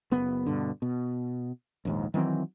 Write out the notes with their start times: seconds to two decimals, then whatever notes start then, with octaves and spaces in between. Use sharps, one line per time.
0.11 F#1 B3
0.46 G2 B2 D3
0.82 B2
1.85 A#1 D#2 G#2
2.14 D#3 E3 F#3 C4